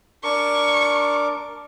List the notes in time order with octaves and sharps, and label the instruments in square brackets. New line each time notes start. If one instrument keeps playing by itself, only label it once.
[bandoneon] D4 A#4 D6 [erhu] C#6